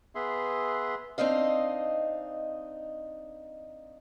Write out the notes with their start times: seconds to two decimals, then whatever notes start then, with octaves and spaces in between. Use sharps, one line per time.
0.15 B3 G#4 E5 C6
1.18 C4 D4 D#4 D#5 F5